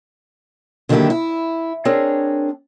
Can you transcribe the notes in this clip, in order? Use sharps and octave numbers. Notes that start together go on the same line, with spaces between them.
D3 D#3 F#3 A#3 E4 G4
E4
C4 D4 G#4 A#4 C#5